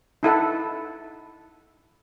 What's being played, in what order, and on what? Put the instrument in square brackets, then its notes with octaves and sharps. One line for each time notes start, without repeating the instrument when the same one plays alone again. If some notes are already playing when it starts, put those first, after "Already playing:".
[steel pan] D#4 E4 A4 F#5